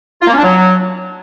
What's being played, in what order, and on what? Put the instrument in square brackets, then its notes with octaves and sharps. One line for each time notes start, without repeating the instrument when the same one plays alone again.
[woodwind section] F4
A#3
C#4
D4
F#3